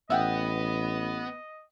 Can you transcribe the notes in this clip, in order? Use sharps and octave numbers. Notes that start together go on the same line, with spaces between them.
A1 B3 D#5 E5 F#5 G5